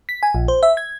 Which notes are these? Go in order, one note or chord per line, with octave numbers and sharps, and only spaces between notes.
B6
G#5
A#1
C5
E5
G#6